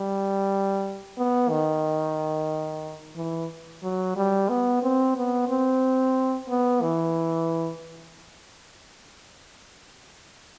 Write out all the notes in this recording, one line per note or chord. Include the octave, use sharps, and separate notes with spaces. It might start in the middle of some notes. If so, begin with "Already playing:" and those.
Already playing: G3
B3
D#3
E3
F#3
G3
B3
C4
B3
C4
B3
E3